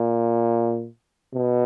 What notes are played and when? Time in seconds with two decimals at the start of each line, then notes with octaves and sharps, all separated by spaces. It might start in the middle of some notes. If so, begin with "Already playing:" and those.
Already playing: A#2
1.35 B2